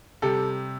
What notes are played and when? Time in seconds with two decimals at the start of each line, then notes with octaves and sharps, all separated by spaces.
0.22 C3 G3 A4